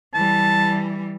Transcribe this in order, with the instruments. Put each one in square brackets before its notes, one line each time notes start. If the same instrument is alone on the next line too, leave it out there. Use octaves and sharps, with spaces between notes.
[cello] E3 G3 [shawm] A5